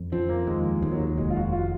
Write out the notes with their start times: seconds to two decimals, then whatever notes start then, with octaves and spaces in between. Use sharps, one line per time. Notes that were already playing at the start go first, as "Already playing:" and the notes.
Already playing: F2
0.12 F3 C4
0.29 A#3
0.47 D#2 G#3
0.82 D#2 G#3
0.92 F#3
1.08 F#3
1.18 F1 G#3
1.30 F4
1.36 F#4
1.53 F4